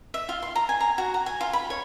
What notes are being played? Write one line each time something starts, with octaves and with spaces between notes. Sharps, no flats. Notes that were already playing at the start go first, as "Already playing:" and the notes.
E5
F4
C6
A#5
G#5
A#5
F#4
A#5
G#5
F4
B5
C#5